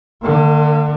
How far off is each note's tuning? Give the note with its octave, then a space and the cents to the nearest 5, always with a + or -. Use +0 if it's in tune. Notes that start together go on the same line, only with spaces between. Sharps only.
D3 +30 A#3 -25